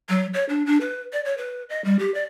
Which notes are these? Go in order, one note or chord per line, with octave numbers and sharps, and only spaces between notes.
F#3
C#5
D4
D4
B4
D5
C#5
B4
D#5
G3
G4
D5